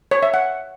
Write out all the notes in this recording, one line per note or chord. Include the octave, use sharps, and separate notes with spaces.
C#5
E5
F#5